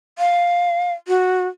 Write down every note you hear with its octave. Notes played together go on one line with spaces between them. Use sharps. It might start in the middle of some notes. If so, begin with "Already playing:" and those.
F5
F#4